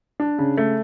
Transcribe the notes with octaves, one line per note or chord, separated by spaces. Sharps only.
D4
C#3
A3